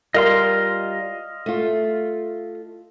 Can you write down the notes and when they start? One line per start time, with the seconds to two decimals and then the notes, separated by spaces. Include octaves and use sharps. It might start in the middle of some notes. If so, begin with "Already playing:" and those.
0.14 G3 F4 A#4 D#5 F5 C6
1.46 A3 F4